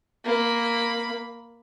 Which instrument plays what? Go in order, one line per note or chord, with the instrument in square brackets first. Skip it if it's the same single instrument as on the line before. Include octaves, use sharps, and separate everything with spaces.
[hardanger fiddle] A#3 B5